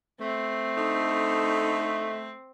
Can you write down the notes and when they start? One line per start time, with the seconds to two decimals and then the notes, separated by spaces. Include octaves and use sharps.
0.21 A3 C4
0.77 D3 D#4